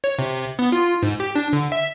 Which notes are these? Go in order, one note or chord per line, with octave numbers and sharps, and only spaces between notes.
C#5
C3
B3
F4
G#2
G4
D4
D3
E5